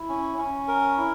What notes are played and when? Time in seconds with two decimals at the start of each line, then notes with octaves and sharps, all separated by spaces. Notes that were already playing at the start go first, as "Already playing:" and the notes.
Already playing: E4
0.09 C#4
0.38 C#4
0.68 A#4
0.98 E4